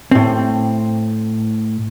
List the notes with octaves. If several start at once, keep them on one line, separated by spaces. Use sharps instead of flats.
A2 C4